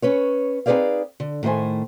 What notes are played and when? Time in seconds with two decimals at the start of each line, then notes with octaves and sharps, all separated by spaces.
0.02 C#4 B4 C#5
0.66 C4 D#4 G#4 B4 D5 F5
1.20 D3
1.43 A2 D#3 A3 C5 G#5